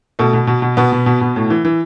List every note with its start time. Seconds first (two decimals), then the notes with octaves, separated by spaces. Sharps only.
0.19 B2 A3
0.33 B2
0.47 B2
0.62 B2
0.77 B2 B3
0.92 B2
1.06 B2
1.21 B2
1.36 A2
1.50 E3
1.65 E3